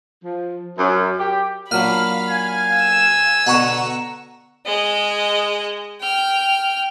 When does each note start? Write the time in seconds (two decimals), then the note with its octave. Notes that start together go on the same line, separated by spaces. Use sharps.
0.24 F3
0.78 F#2
1.19 G4
1.71 A#2 F#3 D4 F5 B5 F6
2.30 G#5
2.78 E6 E7
3.47 B2 D3 F#5 A#5 C#6
4.66 G#3 D#5
6.00 G5 F6